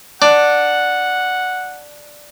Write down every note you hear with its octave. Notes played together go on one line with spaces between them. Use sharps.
D4 F#5